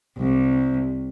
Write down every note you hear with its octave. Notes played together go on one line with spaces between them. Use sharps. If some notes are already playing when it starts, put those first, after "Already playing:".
C2